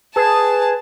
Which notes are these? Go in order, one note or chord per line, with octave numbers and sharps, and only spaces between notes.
G#4 B4 A5